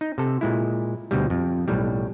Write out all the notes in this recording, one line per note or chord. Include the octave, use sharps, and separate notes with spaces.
D#4
C3 A4
A#2 G#3 E4
D2 B2 G3
F2
B1 A2 G3